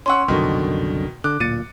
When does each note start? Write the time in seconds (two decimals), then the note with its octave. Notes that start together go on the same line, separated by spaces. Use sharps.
0.06 C#4 F#5 C6 C#6 E6
0.28 C2 F#2 B2 D3 D#3
1.24 D3 D6 F#6
1.40 D1 A#2 A6 C#7 D#7